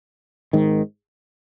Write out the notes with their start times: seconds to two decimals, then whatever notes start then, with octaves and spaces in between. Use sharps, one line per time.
0.53 G#1 G#2 D#3